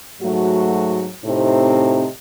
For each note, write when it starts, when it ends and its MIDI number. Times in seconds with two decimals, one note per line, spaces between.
0.21 1.08 44
0.21 1.08 54
0.21 1.08 57
0.21 1.08 66
1.24 2.06 45
1.24 2.06 48
1.24 2.06 60
1.24 2.06 63